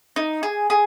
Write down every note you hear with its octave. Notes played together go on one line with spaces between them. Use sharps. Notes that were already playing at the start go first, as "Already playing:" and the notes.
D#4
G#4
G#4